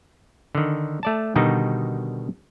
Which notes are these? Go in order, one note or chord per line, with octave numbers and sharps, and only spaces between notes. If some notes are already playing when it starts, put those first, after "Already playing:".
D3 D#3
A3 D5 A5
B2 D3 D#3 G3 D#4 F#4